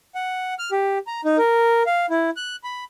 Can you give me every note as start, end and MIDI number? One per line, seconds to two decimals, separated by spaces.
0.15 0.54 78
0.59 0.70 89
0.72 0.98 67
1.07 1.21 82
1.25 1.37 63
1.38 1.83 70
1.86 2.06 77
2.10 2.30 64
2.37 2.56 90
2.64 2.84 83